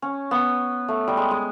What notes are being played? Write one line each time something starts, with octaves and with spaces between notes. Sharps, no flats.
C#4
B3
A3
G3
G#3
G#3